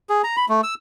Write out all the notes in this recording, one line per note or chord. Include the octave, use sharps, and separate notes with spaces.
G#4
A#5
B5
A3
E6